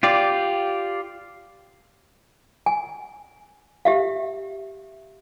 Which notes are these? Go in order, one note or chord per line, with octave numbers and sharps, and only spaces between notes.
F4 G4 D5
G#5
G4 E5 F5